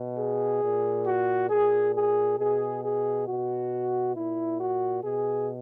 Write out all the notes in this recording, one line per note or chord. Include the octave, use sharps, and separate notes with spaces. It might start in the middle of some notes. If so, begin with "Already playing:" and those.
Already playing: B2
G#4
A#2
F#4
A#2 G#4
G#4
B2 G#4
G#4
B2 F#4
A#2 E4
F#4
B2 G#4